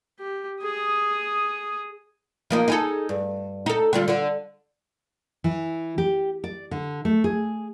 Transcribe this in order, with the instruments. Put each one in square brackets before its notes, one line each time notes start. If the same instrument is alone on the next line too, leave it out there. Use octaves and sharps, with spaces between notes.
[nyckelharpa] G4
G#4 D#6
[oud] F3 A#3 D#4
D#4 G#4 A4
G2
D#4 A4
D3 G3 F4
D3
[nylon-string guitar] E3
G4
D5
D3
A3
G#4